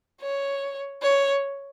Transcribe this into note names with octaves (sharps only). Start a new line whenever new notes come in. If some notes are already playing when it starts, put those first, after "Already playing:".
C#5
C#5